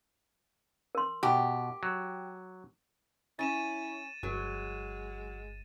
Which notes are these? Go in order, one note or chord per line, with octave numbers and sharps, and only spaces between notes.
A#4 C6
B2 G4
F#3
C#4 E4 A6 D#7 E7
G1 F#3 G#3